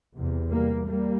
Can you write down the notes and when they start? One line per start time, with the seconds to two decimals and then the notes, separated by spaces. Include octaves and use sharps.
0.15 E2 C3
0.49 G3 A#3
0.85 G3 A#3